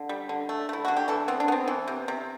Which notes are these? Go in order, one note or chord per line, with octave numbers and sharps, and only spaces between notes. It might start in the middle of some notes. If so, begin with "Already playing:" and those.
Already playing: D3
G3
D3
A3
A3 E4
D3 F#4
G4
E3 A4
B3 C4
D4
B3 C4
E3
C3
C3